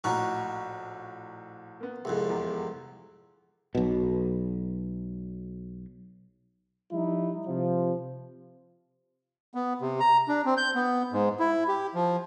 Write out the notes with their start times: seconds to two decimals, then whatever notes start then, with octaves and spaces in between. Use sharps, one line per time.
0.04 A#1 A2 D#4 F#4 A#5 C#6
1.80 A#3 B3
2.05 C2 F2 G#2
2.29 E2
3.75 B1 B2
6.92 F3 G3 D#4 E4
7.47 C3 F3
9.55 B3
9.81 C3
10.00 A#5
10.28 D4
10.45 C4
10.57 G6
10.75 B3
11.12 G#2
11.39 E4
11.68 G4
11.94 F3